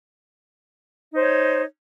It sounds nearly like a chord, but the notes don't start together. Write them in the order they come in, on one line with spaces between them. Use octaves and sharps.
D#4 C5 C#5